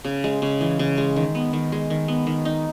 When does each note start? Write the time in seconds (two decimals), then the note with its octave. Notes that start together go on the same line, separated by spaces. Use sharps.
0.04 C#3
0.24 G#3
0.42 C#3
0.61 E3
0.79 C#3
0.98 G#3
1.16 D#3
1.35 B3
1.53 D#3
1.72 G#3
1.90 D#3
2.08 B3
2.27 D#3
2.45 D#4